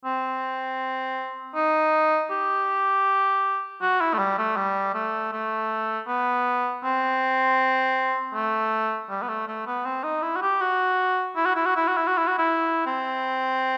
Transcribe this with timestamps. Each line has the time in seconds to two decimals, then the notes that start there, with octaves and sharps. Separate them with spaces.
0.05 C4
1.55 D#4
2.30 G4
3.82 F#4
4.01 E4
4.14 A3
4.18 G3
4.38 A3
4.57 G3
4.94 A3
5.33 A3
6.07 B3
6.84 C4
8.34 A3
9.10 G3
9.23 B3
9.29 A3
9.48 A3
9.66 B3
9.85 C4
10.04 D#4
10.22 E4
10.36 F#4
10.42 G4
10.61 F#4
11.36 E4
11.46 F#4
11.56 E4
11.66 F#4
11.76 E4
11.88 F#4
11.97 E4
12.07 F#4
12.18 E4
12.28 F#4
12.38 E4
12.86 C4